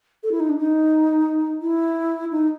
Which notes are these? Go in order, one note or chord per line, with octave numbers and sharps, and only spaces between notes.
A4
E4
D#4
D4
D#4
E4
D#4